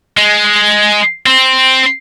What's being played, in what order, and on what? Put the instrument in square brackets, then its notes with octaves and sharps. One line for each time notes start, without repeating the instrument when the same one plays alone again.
[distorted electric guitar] G#3
C4